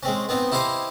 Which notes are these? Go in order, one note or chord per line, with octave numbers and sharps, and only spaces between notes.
G#3 C4 C#4
B3 C4 D#4
E4 G4 C5 D#5 F5 G#5